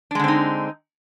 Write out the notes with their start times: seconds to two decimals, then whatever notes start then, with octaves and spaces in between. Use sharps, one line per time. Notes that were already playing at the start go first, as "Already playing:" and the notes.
0.11 D4
0.15 G#3
0.19 D3
0.24 C4
0.28 D#4